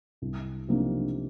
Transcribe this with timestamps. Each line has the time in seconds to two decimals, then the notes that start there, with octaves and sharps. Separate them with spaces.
0.22 C2
0.68 C3 F3 A#3 D#4